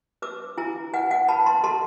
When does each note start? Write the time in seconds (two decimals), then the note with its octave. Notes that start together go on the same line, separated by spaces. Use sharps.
0.22 B4 D6 E6
0.57 E4 G#5 A#5
0.94 B4 F#5 G#5
1.11 F#5 G#5
1.28 B4 A5 B5
1.46 A#5 C6
1.64 A4 A#5 C6